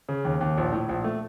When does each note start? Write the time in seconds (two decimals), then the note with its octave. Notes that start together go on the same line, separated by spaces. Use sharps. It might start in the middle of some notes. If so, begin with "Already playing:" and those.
0.09 C#3
0.25 D#2
0.41 D#2
0.57 A#1
0.73 A2
0.89 A#1
1.04 A3